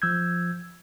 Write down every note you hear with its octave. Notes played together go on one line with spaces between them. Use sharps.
F3 E6 G6 G#6